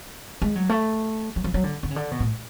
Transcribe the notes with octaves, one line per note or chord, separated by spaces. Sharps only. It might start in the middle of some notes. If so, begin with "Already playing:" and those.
G#3
F#3
A3
F#3
F3
F#3
D3
D3
C#3
D3
B2
A2